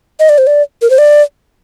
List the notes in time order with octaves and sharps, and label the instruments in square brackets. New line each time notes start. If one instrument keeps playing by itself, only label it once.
[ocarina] D#5
D5
C5
D5
A#4
C5
D5